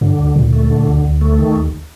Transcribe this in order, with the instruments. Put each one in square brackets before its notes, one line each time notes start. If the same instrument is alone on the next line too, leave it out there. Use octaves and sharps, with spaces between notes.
[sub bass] G2 [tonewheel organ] D3
[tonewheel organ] D2
[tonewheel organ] D2 [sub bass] A#2
[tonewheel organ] A3
D3
D2
D2
A3
D#3
D#2